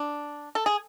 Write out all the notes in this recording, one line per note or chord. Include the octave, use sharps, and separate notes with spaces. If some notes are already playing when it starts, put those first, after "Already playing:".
Already playing: D4
A4
G#4